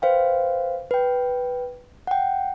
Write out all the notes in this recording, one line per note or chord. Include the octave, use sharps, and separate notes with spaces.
B4 C5 F5 G5
B4 G5
F#5 G5